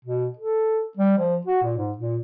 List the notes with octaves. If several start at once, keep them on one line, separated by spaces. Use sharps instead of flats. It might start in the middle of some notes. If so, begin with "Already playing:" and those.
B2
A4
G3
F3
F#4
A#2
G#2
A#2